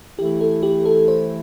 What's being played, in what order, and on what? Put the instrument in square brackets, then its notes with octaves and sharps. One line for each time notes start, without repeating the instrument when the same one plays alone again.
[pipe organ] E3 A3 E4 [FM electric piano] G4
[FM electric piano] A4
G4
A4
C5